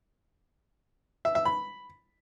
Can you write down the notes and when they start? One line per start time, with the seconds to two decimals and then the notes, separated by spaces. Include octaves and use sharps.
1.25 E5
1.35 E5
1.45 B5